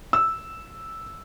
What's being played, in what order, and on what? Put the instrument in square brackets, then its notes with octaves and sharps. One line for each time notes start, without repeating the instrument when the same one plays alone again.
[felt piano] E6